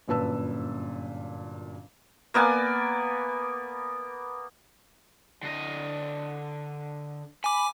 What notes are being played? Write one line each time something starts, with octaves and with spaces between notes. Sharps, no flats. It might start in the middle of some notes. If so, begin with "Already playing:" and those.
G1 F#2 A#2 B4 A5 E6
A#3 B3 D5 G#5
D3 D#5
G#5 B5 D6